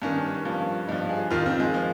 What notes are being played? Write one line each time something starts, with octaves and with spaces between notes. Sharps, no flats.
G2 D#3 C#4
G2 F3
G2 F3 D#4
G#4
F2 D#3 F4
C4
G#3
F3